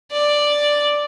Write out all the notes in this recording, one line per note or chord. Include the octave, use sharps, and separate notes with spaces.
D5